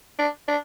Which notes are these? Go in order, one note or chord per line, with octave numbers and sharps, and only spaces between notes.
D4
D4